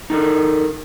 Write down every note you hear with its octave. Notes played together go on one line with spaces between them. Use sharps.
D#4 A4 A#4